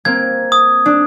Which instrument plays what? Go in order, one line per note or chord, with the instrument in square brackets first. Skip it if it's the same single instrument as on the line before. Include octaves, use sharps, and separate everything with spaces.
[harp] A#3 C4 [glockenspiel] G#6
[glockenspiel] D#6
[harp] D4